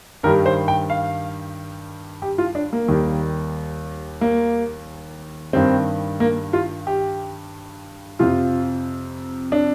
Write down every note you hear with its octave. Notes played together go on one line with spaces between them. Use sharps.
G2 D#3 G3 A#4
C5
G5
F5
G4
F4
D4
A#3
D#2 D#3 G3
A#3
G2 D#3 G3 C4
A#3
F4
G4
F2 C3 F3 F4
D4